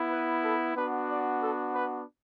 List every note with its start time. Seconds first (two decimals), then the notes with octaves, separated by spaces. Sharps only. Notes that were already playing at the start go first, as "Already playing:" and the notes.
Already playing: B3 E4
0.10 B4
0.43 A4
0.75 B3 D4 F#4 B4
1.08 D5
1.41 A4
1.74 B4